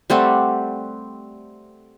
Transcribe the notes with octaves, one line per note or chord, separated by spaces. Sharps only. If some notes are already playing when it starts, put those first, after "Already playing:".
G3 A3 C4 F#5